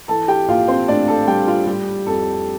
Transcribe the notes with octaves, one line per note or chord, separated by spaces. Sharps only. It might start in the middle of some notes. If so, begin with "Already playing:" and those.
E3 A4 A5
G4 G5
A#1 F4 F5
C4 C5
A2 D4 D5
A4 A5
G3 G4 G5
F4 F5
G3 G4
F2 A4